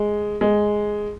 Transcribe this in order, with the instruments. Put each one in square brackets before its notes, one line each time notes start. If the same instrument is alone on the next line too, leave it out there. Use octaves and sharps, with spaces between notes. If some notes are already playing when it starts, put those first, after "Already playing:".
Already playing: [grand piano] G#3
G#3